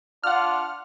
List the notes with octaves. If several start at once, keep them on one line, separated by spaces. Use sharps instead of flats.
D4 F4 F#5 F6